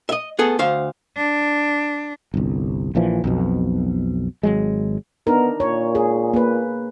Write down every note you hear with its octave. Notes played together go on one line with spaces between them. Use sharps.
D#5 E5
B3 G#4 A4
D2 C5 F5
D4
G1 C2
A#1 A#2 E3 F3
B1 F2 B2
G#1 F#3 G#3
B3 D4 D#4 A#4
A#2 C#5
G#4
A#3 B4